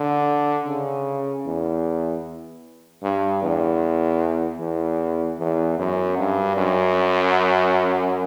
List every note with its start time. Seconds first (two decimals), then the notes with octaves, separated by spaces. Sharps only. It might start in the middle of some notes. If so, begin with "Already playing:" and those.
Already playing: D3
0.66 C#3
1.46 E2
3.03 G2
3.43 E2
4.60 E2
5.39 E2
5.79 F#2
6.18 G2
6.57 F#2